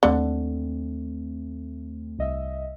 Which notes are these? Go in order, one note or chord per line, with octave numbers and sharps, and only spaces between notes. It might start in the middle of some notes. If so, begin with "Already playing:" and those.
D#2 D3 A3 C4
C2 D#5 E5